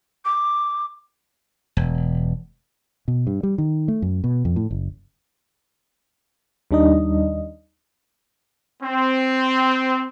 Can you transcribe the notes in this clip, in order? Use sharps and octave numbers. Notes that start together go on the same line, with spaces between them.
D6
E1
B2
G2
G3
D#3
A3
F#2
B2
F2
A2
F#1
D#2 G3 D4 D#4 D#5
C4